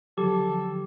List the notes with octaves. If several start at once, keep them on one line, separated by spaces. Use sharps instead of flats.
D3 F3 F#3 G4 A4